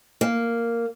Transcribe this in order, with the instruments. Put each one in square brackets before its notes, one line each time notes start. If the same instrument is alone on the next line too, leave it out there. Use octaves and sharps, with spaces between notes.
[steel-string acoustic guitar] A#3